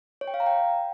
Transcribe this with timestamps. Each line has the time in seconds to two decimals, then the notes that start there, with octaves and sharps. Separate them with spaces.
0.21 C#5
0.28 G5
0.34 F5
0.40 A#5
0.46 G5